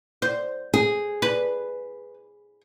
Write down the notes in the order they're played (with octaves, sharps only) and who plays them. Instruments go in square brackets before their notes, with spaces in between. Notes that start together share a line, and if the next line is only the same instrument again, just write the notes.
[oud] C5
[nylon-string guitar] G#4
[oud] B4